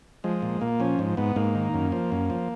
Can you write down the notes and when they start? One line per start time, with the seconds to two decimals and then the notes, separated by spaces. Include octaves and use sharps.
0.24 F3 G#3
0.42 A#2
0.61 A#2 A#3
0.80 F3 C#4
0.99 G#2
1.17 G#2 B3
1.36 G#2 A#3
1.55 D#3
1.74 F#2
1.92 F3
2.12 F#2
2.30 F3